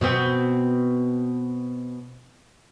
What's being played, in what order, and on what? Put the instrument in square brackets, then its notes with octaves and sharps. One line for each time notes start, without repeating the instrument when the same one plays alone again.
[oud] B2 B3 C4